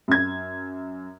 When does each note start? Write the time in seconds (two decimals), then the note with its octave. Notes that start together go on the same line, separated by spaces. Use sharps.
0.08 F#2 G#6